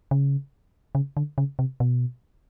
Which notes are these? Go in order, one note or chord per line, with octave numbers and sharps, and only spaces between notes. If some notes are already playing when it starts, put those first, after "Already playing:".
C#3
C#3
D3
C#3
C3
B2